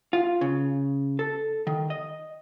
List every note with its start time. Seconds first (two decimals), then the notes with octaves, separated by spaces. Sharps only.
0.13 F4
0.41 C#3
1.19 A4
1.67 D#3
1.90 D#5